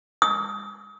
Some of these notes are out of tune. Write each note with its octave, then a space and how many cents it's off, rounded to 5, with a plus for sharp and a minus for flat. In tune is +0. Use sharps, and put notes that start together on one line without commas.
D#6 +35